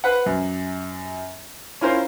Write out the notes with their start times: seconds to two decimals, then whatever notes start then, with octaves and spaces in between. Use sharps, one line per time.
0.04 B4 C5 F#5
0.26 F#2
1.81 C#4 E4 F4 A#4 C5